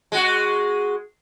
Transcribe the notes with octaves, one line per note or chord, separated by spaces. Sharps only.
G#3 F#4